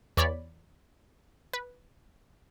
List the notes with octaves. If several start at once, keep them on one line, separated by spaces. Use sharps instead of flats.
E2 C#5 D5 B5 C#6
B4